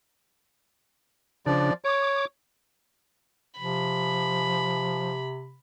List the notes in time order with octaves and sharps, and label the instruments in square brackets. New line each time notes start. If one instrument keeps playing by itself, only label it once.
[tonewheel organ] C#3 D4 [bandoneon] F3 D5
[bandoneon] C#5 [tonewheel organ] D6
[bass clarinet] C3 [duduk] F3 [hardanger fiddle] B5